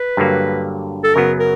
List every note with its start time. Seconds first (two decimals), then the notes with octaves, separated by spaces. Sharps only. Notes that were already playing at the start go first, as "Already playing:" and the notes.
Already playing: B4
0.17 G2 D3 F#3 A#3
1.04 A4
1.15 F#2 C#3 F#3 B3 A#4
1.39 A#4